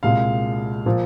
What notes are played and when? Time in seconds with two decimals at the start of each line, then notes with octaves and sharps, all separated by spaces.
0.03 C2 A#2 G#3 F5
0.86 A#2 F3